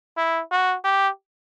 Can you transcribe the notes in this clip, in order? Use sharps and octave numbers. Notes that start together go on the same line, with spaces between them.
E4
F#4
G4